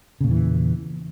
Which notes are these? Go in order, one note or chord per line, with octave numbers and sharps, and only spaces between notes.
E2 A#2 C#3 E3